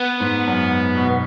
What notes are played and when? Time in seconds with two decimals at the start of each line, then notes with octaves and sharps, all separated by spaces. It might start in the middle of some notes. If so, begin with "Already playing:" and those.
Already playing: B3
0.20 G#2
0.47 F#2
0.95 B2